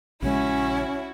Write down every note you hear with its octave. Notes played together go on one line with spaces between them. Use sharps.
A#1 C#3 G#3 C#4 E4 F#4